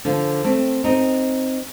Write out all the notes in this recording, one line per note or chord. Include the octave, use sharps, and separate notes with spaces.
D3 F3
A3 C4
C4 D#4